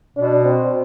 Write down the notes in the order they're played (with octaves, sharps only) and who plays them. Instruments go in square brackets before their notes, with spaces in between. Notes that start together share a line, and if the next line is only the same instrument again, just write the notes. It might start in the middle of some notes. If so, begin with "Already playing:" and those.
[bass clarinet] B2 [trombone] D4
[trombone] C4